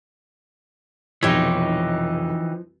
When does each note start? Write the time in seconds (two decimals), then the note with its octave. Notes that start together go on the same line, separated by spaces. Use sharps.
1.23 F1 B1 E3 F3 D#4 G4 C#5